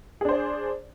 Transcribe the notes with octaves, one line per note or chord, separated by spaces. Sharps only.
D4 G#4 C5 D5